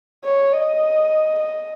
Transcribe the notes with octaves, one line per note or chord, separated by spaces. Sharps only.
C#5
D#5
D#5